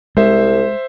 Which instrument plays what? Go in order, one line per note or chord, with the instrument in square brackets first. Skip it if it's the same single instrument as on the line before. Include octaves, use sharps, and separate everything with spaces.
[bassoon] C2 [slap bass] G#3 [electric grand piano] C5 E5